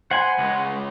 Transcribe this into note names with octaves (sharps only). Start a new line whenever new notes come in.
C5 F#5 G#5 B5
C#2 G#3